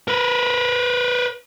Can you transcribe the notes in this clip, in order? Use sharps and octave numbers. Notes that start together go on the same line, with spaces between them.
A#4 B4